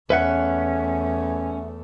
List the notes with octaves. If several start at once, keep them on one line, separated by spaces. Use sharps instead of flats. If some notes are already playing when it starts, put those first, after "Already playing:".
E2 A3 C#4 B4 E5 F#5